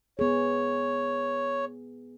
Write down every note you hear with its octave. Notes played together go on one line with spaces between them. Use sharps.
B3 G#4 C#5